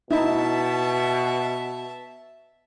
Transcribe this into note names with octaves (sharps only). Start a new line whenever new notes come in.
B2 D#4 E4 E5 A5